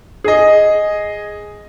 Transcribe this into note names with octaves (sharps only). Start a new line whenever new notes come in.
G#4 D#5